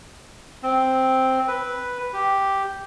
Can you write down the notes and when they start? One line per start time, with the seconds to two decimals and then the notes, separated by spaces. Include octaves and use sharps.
0.63 C4
1.48 B4
2.13 G4